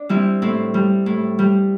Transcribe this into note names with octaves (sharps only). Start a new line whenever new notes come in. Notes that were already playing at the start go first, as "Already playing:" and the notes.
Already playing: D4
G3 C4 E4
A2 C4
G3
A2
G3